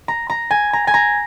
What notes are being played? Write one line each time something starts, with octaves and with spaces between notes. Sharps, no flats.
A#5
A#5
G#5
A#5
G#5
A#5